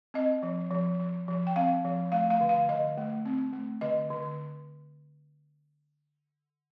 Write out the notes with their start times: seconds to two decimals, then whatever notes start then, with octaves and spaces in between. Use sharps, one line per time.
0.14 C4 D#5
0.43 F3
0.71 F3
1.00 F3
1.28 F3
1.47 G5
1.56 C4 F5
1.84 F3
2.12 A3 F5
2.30 F5
2.41 D3
2.49 F5
2.69 D3 D#5
2.97 A3
3.25 C4
3.53 A3
3.81 D3 D#5
4.10 D3